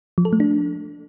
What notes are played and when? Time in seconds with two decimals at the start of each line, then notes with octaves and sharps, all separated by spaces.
0.18 F3
0.25 A4
0.33 A3
0.40 D4